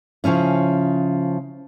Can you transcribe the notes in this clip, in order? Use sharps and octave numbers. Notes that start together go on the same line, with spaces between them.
C#3 F3 C#4 E4